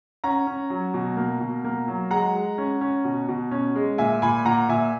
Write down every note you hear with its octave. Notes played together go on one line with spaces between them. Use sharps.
C#4 F#5 A#5
C#4
F#3
B2
A#3
B2
A#3
F#3
G#3 F#5 A#5
G#3
C#4
C#4
B2
B2
C#4
G#3
A#2 E5 G#5
A#2 G#5 B5
A#2 F#5 A#5
A#2 E5 G#5